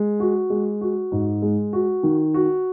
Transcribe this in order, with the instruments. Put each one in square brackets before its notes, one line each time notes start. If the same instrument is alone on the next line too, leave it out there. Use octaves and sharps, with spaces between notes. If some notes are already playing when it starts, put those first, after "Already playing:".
Already playing: [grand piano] G#3
F#4
G#3
F#4
G#2
G#3
F#4
D#3
F#4